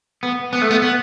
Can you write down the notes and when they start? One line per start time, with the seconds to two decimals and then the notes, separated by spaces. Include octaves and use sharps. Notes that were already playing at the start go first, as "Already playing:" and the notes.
0.23 B3
0.53 B3
0.62 A3
0.71 B3
0.82 B3